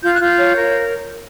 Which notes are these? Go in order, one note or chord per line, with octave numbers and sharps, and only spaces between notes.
F4 G6
F#6
F4 G6
C#5
A#4